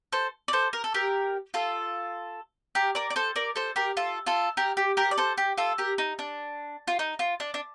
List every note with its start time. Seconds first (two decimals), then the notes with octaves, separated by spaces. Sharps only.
0.12 A4 C5
0.48 D5
0.53 A4 C5
0.73 A#4
0.84 A4
0.94 G4 A#4
1.54 F4 A4
2.75 G4 A#4
2.95 A#4 D5
3.10 D5
3.16 A4 C5
3.36 A#4 D5
3.56 A4 C5
3.76 G4 A#4
3.97 F4 A4
4.26 F4 A4
4.57 G4 A#4
4.77 G4
4.97 G4 A#4
5.11 D5
5.18 A4 C5
5.38 G4
5.58 F4 A4
5.78 G4 A#4
5.98 D#4
6.19 D4
6.88 F4
6.99 D#4
7.19 F4
7.40 D4
7.54 D4